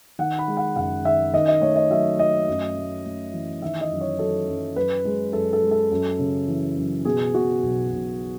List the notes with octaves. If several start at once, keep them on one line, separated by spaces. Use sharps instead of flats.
D#3 F#5
B5
G#3
F#5
F#1 F#5
D#3 E5
D#3 D#5
D#5
A3 C#5
D#5
F#3 E5
A3 D#5
F#2
A3
A3
E3
D#3 E5
D#5
F#2
C#5
F#3 A4
F#2
F#2 B4
G#3
F#2 A4
A4
G#3
A4
F#2
C#3
E3
F#2
B2 G#4
B2 F#4
B1
B1